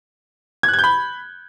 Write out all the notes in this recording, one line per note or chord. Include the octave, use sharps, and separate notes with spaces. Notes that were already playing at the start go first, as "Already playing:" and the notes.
G#6
F#6
G#6
G6
B5